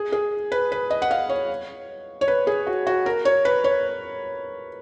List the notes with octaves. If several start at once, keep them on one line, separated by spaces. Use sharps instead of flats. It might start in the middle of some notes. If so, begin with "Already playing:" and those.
Already playing: G#4
G#4
B4
B4
D#5
F#5
F5
C#5
C#5
B4
G#4
F#4
F#4
A#4
C#5
B4
C#5